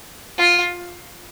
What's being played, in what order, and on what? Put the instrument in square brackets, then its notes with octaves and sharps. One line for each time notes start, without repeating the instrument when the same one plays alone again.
[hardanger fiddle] F4